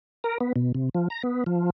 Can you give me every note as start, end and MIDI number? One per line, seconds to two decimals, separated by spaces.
0.24 0.38 70
0.41 0.53 59
0.56 0.72 47
0.75 0.89 48
0.94 1.08 53
1.10 1.22 82
1.23 1.44 59
1.46 1.70 53